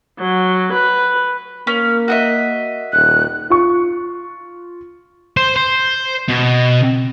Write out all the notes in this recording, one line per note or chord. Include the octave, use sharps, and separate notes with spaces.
F#3
B4
A#3 C#4
F#4 D#5 E5
D#1 F#6
F4 C#6
C5
C5
B2